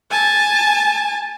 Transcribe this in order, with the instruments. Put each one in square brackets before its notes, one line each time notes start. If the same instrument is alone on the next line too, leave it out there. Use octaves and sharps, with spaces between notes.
[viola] G#5 A5